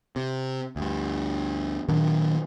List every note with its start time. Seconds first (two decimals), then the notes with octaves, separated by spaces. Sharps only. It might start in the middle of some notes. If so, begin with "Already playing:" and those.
0.16 C3
0.76 D2 G2
1.89 A#2 D#3 F#3 D4